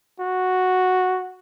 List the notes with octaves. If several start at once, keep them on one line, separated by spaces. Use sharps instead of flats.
F#4